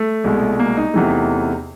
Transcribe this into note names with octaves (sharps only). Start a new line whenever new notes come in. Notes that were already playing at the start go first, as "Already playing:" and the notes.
Already playing: A3
C2 B2 G#3
A#3
D#4
E2 C3 E3 A3